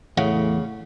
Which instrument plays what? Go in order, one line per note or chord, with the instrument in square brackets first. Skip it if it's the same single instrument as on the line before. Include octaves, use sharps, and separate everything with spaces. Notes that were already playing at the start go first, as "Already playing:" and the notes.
[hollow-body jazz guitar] E2 F#5 [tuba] A2 [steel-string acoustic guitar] C#3